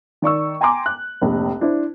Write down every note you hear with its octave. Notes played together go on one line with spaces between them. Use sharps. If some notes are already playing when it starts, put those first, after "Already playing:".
D#3 D5 C#6 E6
G5 G#5 A#5 C6 D6
F#6
F1 A#1
D4 E4 C5